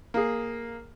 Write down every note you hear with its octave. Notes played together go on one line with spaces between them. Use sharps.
A#3 G#4